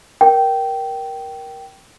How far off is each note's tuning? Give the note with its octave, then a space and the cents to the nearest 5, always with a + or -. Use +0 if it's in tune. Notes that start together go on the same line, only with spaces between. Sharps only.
A#4 +15 G5 -15